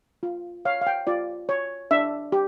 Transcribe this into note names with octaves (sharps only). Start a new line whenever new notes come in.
F4
C#5 F5
F5
G5
F4 D5
C#5
D4 E5
G4